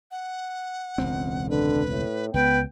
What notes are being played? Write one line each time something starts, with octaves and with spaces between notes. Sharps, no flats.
F#5
E1 C#2 C4
D3 B4
A2
C#2 B3 B4 G5